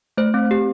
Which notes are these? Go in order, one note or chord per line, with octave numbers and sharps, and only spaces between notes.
A3 C5
C4
G4